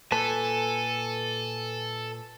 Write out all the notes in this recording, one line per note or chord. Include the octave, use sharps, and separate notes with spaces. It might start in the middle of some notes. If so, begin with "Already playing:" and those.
A#2 A4 B4 G#5 A5